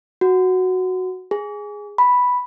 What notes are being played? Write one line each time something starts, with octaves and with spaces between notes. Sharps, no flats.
F#4
G#4
B5